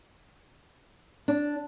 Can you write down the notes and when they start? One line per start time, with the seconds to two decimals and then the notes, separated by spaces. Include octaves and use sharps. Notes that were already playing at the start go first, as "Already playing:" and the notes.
1.28 D4